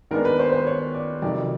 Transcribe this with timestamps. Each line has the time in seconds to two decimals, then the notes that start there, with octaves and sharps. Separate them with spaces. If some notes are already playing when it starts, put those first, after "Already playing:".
0.11 D#2 D#3 G#3 B3 D4 A#4
0.25 B4
0.39 C5
0.49 B4
0.52 C5
0.67 C#5
0.95 D5
1.22 F2 C3 D#3 F#3 D5